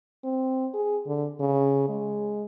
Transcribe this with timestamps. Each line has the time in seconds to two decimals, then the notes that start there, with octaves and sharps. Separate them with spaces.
0.24 C4
0.74 G#4
1.07 D3
1.40 C#3
1.89 G#3